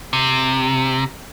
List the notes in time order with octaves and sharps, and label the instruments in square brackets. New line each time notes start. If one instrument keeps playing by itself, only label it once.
[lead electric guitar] C3